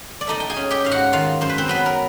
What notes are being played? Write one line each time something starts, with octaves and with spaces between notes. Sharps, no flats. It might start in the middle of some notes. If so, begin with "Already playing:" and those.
D5
A3 D#4 D#5
G5
G#4 G#5
C#4
G4 G5
G#2 F5
F#4 F#5
D#3 F4 F5
F#2 C5
B4
C4 C5
F#3 B3 B4
A#4